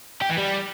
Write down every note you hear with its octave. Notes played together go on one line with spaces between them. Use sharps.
G4
E3
G3